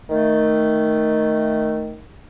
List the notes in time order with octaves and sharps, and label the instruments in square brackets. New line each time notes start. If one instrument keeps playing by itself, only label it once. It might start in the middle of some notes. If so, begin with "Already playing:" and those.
[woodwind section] D#3 A3